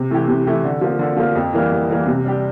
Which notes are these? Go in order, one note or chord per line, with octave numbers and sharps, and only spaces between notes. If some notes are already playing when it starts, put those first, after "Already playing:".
Already playing: C3
E3 A3 E4 G4
C3
E3 A3 E4 G4
D3
F3 A#3
D3
F3 A#3
F2
E3 G3 A#3
F2
E3 G3 A#3
C3
G3 D4 G4